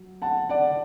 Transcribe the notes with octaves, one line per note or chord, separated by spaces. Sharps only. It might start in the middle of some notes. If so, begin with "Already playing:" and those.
Already playing: F#3
F#5 A5
D5 F#5